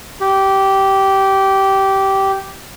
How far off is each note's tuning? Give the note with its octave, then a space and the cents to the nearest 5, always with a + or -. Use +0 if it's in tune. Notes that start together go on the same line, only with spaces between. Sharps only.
G4 -15